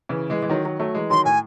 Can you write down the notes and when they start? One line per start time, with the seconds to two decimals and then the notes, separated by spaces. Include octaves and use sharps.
0.09 C#3 E3
0.30 E3 G#3
0.42 E3
0.50 D#3 F#3
0.65 D#3 F#3
0.80 F#3 A3
0.95 E3 G#3
1.10 D#3 F#3 C6
1.25 A2 G#5